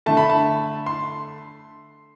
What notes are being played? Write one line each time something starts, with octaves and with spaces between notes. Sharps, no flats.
D3 A3 A5
B5
A5
C6